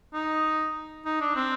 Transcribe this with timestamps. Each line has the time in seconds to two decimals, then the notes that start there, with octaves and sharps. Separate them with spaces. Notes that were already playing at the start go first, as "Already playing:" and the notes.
0.14 D#4
1.05 D#4
1.21 D4
1.36 C4